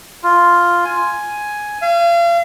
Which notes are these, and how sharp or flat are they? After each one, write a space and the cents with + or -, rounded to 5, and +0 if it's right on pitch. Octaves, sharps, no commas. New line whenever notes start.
F4 +0
G#5 +5
F5 -35